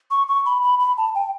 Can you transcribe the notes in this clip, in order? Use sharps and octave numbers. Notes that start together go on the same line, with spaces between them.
C#6
C#6
B5
B5
B5
A5
G5